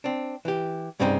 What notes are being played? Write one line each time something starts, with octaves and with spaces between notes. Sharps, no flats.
C4 D4
E3 G4
C2 G2 C#3 G3 C4 D#4